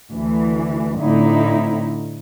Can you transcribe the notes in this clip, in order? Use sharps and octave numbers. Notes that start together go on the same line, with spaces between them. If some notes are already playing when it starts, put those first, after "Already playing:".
D2 E3
A2 D3 C4 D#4 E4